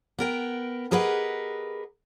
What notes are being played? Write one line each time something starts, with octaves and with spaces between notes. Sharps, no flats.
B3 A#4 G5
G4 G#4 A#4 B4 D#5 F#5